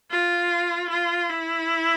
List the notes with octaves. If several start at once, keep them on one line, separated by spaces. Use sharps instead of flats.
F4
F4
E4